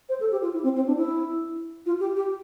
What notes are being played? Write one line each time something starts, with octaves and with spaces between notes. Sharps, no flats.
C5
A4
G4
F4
E4
C4
C4
D4
E4
F4
G4
G4